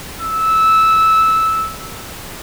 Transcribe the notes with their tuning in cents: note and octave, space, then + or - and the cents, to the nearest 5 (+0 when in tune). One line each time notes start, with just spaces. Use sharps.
E6 -15